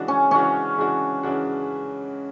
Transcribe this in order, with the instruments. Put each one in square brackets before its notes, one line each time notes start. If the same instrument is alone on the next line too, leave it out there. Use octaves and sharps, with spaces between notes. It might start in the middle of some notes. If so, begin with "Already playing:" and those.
Already playing: [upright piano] C#3 E3 G#3 D4 F#4
[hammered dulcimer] C#4
[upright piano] C#3 E3 G#3 D4 F#4 [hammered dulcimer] C#4
[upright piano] C#3 E3 G#3 D4 F#4
C#3 E3 G#3 D4 F#4